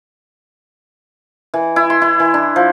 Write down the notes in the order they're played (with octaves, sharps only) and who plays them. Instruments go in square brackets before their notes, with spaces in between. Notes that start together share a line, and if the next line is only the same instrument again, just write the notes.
[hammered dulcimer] E3
E4
C6
E4
E3
D4
F3